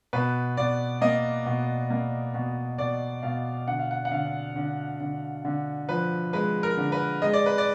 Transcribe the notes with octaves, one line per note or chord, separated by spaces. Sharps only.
B2 B4
B2 D5
A#3 D#5
B2
A#3
B2
B2 D5
B2 F5
D3 F#5
F5
F#5
F#5
D3 F5
D3
D3
D3
F3 B4
G#3 B4
A#4
D3
B4
G#3 D#5
D5
B4
D5